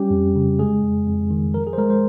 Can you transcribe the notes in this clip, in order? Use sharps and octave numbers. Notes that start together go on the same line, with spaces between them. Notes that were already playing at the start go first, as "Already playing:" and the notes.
Already playing: G3 C#4 G4
F2
C#3
G#3 G#4
F2
F2
D#3
F3 A#4
G#4
C5
G#3 A#4
C5